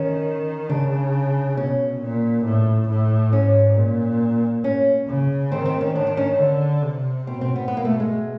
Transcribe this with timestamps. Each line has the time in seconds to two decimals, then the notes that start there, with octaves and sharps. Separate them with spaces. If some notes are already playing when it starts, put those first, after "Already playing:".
Already playing: D#3 C#4
0.69 C#3 D4
1.57 B2 C#4
2.01 A#2
2.45 A2
2.89 A2
3.32 G#2 C#4
3.77 A#2
4.64 C#4
5.08 C#3
5.52 D#3 C4
5.66 C4
5.81 C#4
5.95 D#3 D4
6.07 D4
6.17 C#4
6.39 D3
6.83 C3
7.27 B2 C4
7.41 C4
7.56 B3
7.68 B2 B3
7.77 A#3
7.85 A3
8.00 G#3